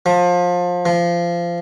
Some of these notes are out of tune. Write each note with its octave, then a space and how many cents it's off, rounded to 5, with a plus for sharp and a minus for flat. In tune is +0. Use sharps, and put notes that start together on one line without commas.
F3 +25
F3 -20